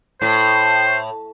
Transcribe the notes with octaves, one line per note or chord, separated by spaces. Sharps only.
A2 C5